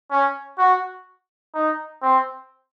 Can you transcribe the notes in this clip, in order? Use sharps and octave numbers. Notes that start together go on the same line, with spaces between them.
C#4
F#4
D#4
C4